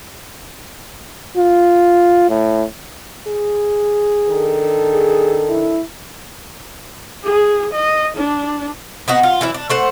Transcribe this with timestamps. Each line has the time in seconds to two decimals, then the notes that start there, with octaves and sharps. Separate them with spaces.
1.37 F4
2.29 A2
3.27 G#4
4.29 D#3 D4 A4
4.93 G#4
5.49 E4
7.24 G#4
7.73 D#5
8.17 D4
9.08 B3 D#4 F#4
9.23 F4
9.41 E3 F#3 E4
9.54 D4
9.70 A3 C5 F#5